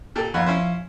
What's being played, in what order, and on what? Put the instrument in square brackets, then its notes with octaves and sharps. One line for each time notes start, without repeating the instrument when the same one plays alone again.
[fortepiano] A#2 G4 A4
[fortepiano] D#2 F#5 B5 [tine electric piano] F3 F5
[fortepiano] C#4 E4 C5